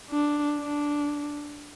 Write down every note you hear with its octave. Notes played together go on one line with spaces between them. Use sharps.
D4
D4